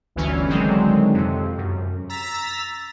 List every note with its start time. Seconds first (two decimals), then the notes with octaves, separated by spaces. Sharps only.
0.16 G1 D2 E3 C#4
0.49 D3 D#3 F#3 G#3 C4
1.14 F2 C3
1.58 F#2
2.09 A#5 E6 A6 B6